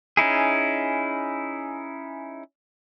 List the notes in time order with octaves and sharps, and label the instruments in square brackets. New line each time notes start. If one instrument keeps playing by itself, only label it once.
[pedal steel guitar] C#4 D#4 E4 G#4